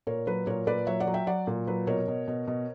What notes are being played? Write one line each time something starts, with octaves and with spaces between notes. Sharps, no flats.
A#2 A#4 C#5
F#3 B4
A#2 A#4 C#5
A#2 B4 D5
F#3 C#5 E5
D5 F#5
F#3
E5 G5
F#3 D5 F#5
A#2
F#3 B4
B2 A#4 C#5
B2
B2
B2